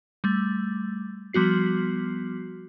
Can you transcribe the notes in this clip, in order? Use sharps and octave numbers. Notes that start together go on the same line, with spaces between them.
G3 A3
F3 G3 B3 F#4 C7